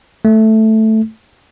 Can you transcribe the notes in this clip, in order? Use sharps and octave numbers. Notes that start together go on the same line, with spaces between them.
A3